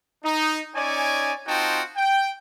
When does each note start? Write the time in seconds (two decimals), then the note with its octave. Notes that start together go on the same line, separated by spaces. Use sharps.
0.24 D#4
0.75 C#4 D#4 C#5 D5 G#5
1.47 C4 D#4 F4 F#4 G5 A5
1.97 G5